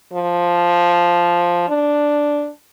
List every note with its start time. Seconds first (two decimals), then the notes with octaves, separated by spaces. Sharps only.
0.14 F3
1.69 D4